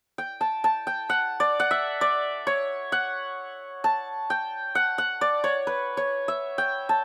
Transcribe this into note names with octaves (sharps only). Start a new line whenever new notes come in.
G5
A5
A5
G5
F#5
D5
F#5
E5
D5
C#5
F#5
A5
G5
F#5
F#5
D5
C#5
B4
C#5
E5
G5
A5